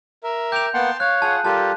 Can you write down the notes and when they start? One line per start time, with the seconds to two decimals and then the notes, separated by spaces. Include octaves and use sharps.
0.24 A#4 E5
0.52 G5 D6 G6 F7
0.74 A#3 B3 F#5 G5 A5 C6
1.00 C#5 F5 F#6
1.22 F4 G#4 F#5 A5
1.45 G3 F4 G4 A4 A#4 A5